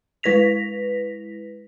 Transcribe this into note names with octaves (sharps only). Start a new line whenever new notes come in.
G#3 E4 B4 A#6 B6 F7